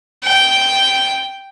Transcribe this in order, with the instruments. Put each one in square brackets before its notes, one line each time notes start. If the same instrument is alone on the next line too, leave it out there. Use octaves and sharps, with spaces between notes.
[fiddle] G5